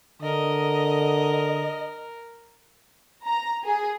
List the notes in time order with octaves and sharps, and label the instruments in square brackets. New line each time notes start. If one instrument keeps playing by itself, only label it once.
[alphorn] D3 [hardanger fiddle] A#4 [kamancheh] D#5
[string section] A#5
G#4